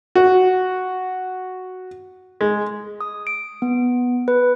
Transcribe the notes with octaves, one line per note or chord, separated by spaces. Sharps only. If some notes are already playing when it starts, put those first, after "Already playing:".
F#4
G#3
D#6
D7
B3
B4